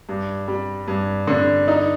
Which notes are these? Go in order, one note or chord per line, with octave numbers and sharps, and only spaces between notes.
G2
G3
G2
D3
D#4